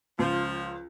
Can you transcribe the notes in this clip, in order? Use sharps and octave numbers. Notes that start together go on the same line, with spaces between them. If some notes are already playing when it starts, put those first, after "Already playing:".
C#2 F3